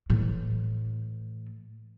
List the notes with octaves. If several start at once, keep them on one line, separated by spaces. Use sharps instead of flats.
A2 E3